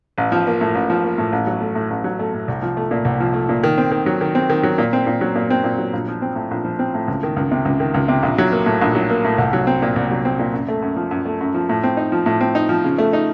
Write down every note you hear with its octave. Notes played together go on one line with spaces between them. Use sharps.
A1
F3
A#3
A2
A1
F3
A#3
A2
A1
F#3
A3
A2
A1
F#3
A3
A2
C2
F3
A3
A#2
C2
F3
A3
A#2
D#3
C4
D#3
F#3
D#3
C4
D#3
F#3
A#2
C4
A#2
F#3
A#2
C4
A#2
F#3
A#1
F3
C4
A2
A#1
F3
C4
A2
C#2
D#3
C#2
C3
C#2
D#3
C#2
C3
A#1
F#3
A#3
A2
A#1
F#3
A#3
A2
C2
F#3
C4
A#2
C2
F#3
C4
A#2
F#2
A3
F#2
F3
F#2
A3
F#2
F3
A2
C4
D#4
F3
A2
C4
D#4
F3
C#3
A3
D#4